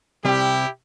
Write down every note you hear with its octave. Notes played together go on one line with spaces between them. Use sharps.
C2 C3 G3 C4 E4 G4